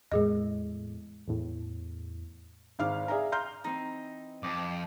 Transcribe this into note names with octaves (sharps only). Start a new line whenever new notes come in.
E2 A2 G#3 G#4 D#5
E2 A2
G#1 G#2 F5 D6 F6
G#4 D5 E5 F5 G#5 A#5
A#5 C6 F6 G6
E3 C4 D#4
F2 D#5 G5 D6